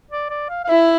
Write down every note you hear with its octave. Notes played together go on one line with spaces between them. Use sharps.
D5
D5
F5
F5
E4 E5